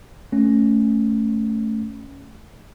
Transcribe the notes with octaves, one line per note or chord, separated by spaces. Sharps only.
A3 C#4